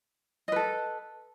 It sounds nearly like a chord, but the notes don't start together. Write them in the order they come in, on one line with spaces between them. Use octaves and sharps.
D#5 B4 A4